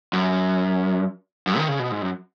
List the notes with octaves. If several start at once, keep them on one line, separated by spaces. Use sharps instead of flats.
F#2
F#2
D#3
C#3
B2
G#2
F#2